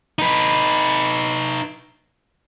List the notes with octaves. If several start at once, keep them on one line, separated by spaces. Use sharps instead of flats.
D#4 B4